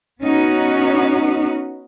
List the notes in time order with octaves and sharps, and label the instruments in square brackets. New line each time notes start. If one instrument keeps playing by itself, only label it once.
[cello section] B3 C#4 D#4 F#4